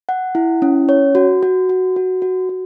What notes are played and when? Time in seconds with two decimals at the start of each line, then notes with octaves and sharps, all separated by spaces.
0.09 F#5
0.35 E4
0.62 C#4
0.89 C#5
1.15 F#4
1.43 F#4
1.69 F#4
1.96 F#4
2.22 F#4
2.49 F#4